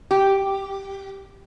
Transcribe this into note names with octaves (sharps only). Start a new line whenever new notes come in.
G4